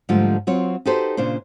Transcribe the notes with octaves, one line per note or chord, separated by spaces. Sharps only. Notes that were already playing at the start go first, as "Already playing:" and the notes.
G#2 D3 F3 G3 A3 F4
F#3 C4 F4 C#5
D#4 F#4 G4 A4 B4 C5
A#2 C#3 D4 C5